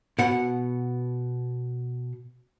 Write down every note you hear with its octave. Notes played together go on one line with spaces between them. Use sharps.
B2 F#5